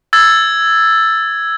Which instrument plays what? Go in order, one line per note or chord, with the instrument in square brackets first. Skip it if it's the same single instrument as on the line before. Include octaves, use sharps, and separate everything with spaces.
[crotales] E6 G#6 A6